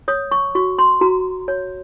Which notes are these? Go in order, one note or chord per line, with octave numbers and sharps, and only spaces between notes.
C#5 D#6
C#6
F#4 C#6
C6
F#4 A#5
C#5